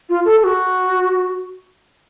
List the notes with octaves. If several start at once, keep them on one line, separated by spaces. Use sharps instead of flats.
F4
A4
A4
F#4